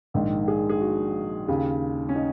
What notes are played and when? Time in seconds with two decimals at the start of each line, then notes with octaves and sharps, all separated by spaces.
0.14 A#1 G#2 D#3
0.48 G#4
0.69 G#4
0.81 F#4
1.48 D#2 C#3
2.09 C#4
2.16 D#4